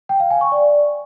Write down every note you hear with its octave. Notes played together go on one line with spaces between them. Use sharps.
G5
F5
G#5
C#6
D5